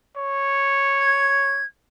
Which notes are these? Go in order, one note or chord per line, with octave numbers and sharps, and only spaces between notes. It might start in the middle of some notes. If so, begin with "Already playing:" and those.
C#5
G#6